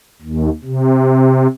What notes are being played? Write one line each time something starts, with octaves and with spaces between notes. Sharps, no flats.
D#2
C3